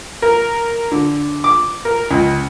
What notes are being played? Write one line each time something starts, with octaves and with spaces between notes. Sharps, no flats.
A#4
D3
D6
A#4
C#2